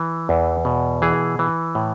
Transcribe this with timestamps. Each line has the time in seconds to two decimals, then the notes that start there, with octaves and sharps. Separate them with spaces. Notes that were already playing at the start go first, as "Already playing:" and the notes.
Already playing: E3
0.29 E2
0.65 B2
1.02 E3 G#4
1.39 E3
1.75 A2